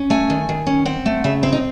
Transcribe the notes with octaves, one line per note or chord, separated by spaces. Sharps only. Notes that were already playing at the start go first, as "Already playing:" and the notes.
Already playing: C#4
A3 G#5
D#3
D#3
C#4
C4 F#5
A3
C#3 E5
C4 E4
D#4